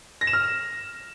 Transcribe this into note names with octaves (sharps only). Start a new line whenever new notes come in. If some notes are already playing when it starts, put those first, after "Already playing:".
A#6
E7
F6